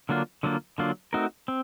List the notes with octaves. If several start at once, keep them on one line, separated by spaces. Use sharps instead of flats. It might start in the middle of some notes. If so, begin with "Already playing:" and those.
D3 F#3 A#3 D4 F4
D3 F#3 A#3 D4 F4
D3 F#3 A#3 D4 F4
A3 C4 D#4 F#4 A#4
C4